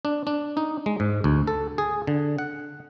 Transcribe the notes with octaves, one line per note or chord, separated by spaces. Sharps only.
D4
D4
D#4
G#3
G#2
D2
A4
G#4
D3
F#5